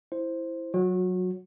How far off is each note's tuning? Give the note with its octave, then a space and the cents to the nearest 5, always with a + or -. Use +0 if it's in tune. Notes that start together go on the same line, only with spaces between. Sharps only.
E4 +0 C5 +0
F#3 -5 F#4 -30